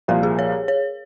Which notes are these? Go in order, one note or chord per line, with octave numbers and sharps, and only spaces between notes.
C2 A#2 F3 A#3 A#4
G#4
C#5
C#5